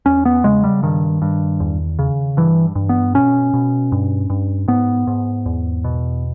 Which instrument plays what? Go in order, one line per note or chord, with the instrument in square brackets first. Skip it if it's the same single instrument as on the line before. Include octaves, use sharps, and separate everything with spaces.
[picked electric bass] E2 C#4
B3
C#3 G#3
G3
G2 D#3
G2
E2
C#3
G2 E3
G2
B3
B2 C#4
B2
G2
G2
G#2 B3
G#2
E2
B2